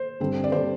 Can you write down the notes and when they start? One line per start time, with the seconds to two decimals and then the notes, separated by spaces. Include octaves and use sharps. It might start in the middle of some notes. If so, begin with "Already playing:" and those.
Already playing: C5
0.20 G2 D3 G3 C4
0.44 D5
0.52 D3 G3 C4 C5